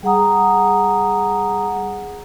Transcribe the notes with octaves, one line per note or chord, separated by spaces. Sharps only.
G3 G#4 F#5 A#5 D#6